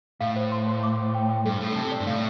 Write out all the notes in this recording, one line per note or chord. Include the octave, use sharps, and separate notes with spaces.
A2 F5
C5
C6
C5
D6
C5
G5
G5
G2 A4
A2 A4
D3
C3 A5
D5
G2
A2 F5